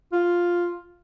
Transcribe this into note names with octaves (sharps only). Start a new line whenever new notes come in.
F4